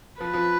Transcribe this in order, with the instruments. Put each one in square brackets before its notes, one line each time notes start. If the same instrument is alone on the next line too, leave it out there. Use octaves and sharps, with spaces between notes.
[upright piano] F3 [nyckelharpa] B4
[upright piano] F3